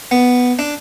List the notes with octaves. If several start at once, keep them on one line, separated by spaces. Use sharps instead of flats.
B3
D4